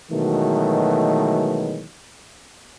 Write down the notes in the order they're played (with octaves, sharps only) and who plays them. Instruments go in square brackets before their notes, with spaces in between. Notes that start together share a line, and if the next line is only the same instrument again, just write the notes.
[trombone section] B2 D#3 E3 F#3 G#3 A3